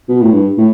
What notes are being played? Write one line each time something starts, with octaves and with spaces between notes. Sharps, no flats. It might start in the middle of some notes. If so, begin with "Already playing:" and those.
B2
A2
G2
A2